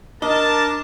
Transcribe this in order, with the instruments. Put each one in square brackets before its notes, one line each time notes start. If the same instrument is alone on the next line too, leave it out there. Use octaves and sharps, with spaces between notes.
[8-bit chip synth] D4 D6 [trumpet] A#4 [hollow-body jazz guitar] D#5 [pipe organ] A5